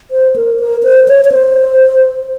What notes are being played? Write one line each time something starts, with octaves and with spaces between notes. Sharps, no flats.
C5
A#4
A#4
C5
C#5
C#5
C5